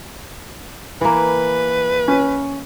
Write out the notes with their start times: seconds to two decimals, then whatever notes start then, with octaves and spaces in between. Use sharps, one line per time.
1.01 E3 A#3 B4
2.08 C#4